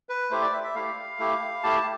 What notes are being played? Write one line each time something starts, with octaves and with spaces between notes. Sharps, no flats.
B4
A3 E4 G4 C5
D5
E5
E5
A3 E4 G4 F5
A3 E4 G4
A3 E4 G4 A5